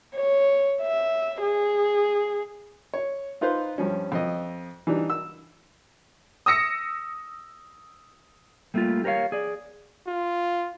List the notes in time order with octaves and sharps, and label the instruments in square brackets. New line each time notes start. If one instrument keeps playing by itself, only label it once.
[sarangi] C#5
E5
G#4
[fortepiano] C#5
D#4 F4 B4 C5 F5
G2 F3 C#4
F2 D#5
E3 G3 D4 D#4
E6
[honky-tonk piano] D#6 E6 A#6 C#7
[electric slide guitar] G3 A3 A#3 E4 F4
G4 A#4 B4 C#5 F5
G#4 D5
[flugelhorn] F4